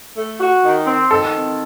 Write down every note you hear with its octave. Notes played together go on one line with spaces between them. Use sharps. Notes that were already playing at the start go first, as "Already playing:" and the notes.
A3
F#4
D#3
C4
D#3 A4
C4